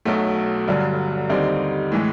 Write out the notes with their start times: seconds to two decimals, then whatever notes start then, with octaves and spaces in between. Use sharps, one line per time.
0.05 B1 B2 F#3 A3
0.68 G1 G2 D3 F#3
1.30 D#2 D3 G3 C4 D#4
1.92 A2 E3 G#3